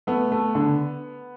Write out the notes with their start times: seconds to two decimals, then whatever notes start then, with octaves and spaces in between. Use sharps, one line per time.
0.07 A3 B3
0.32 A3
0.55 D3